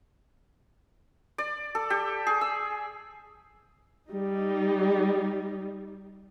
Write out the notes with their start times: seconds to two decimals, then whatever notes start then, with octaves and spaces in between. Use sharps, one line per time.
1.38 D5
1.75 A4
1.90 G4
2.27 G#4
2.41 E6
4.08 G3 D#4